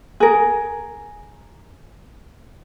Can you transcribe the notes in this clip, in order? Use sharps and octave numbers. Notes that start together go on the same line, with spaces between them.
G#4 A#4